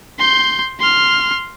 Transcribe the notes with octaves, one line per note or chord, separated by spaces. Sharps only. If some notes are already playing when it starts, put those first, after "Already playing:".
C6 G6
C6 F6